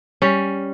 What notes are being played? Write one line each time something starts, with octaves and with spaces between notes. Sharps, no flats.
G3 C#4